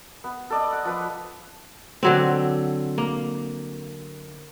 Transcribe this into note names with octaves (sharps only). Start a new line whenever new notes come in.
B3
A4 D5 D#5
F#5
F3 B4 D#6
D3 F#3 C4
A#3